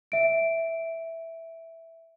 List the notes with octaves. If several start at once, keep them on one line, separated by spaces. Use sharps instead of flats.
E5 D7